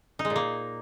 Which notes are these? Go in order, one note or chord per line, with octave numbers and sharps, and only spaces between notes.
D#4
G#3
A#2
A#3